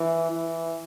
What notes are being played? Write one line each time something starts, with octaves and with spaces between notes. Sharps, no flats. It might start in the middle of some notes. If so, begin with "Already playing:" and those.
Already playing: E3
E3